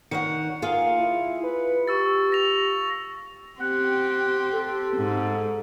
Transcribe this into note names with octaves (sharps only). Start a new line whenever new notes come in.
D#3 C#5 F#5 C#7
A#3 F4 G#4 F5
E4
B4
G4 C#6 E6 A6
A#6 F7
C4 G4 F#5
A4
G#2